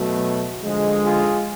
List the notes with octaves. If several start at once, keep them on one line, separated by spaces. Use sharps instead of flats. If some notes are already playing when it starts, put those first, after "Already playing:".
Already playing: B2 F#3 A3
D3 F3 G#3
F4 G#4